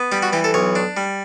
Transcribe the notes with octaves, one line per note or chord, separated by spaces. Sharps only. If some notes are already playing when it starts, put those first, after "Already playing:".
Already playing: B3
G3 G4
F#4
E3 G4
A4
B1 C#5
D4
G3